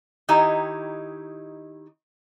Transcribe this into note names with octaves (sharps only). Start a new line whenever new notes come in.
D#3 D#4 E4 G4 C#5 A#5